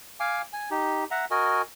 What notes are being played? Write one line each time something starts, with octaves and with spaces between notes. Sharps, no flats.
F5 G#5 D6
G#5
D#4 G4
E5 F#5 A#5
F#4 A#4 D#5 G#5